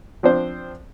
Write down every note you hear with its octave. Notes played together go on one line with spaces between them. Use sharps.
F3 C4 D4 C5